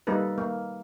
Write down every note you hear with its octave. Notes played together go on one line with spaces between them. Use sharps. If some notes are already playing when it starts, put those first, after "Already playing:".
G3 A#3 D#4 A4 B4
A#3